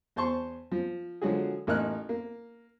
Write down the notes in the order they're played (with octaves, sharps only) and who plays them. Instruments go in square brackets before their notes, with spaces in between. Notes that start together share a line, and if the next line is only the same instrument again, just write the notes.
[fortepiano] E2 C5 A5 C6 C#6
F3
D3 F3 F#3 G#3 F#4 G#4
A1 A#3 D#4 F6 F#6
A#3